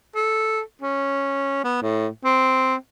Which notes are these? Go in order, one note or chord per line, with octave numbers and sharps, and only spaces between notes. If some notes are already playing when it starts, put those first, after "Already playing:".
A4
C#4
B3
A2
C4